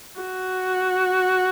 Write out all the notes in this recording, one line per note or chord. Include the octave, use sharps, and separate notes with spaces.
F#4